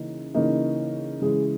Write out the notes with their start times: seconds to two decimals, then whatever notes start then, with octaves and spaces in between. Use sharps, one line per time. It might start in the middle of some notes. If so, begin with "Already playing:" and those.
Already playing: C#3 E3 A#3 D#4
0.35 C#3 E3 A#3 D#4
1.22 C#3 E3 G#3 G#4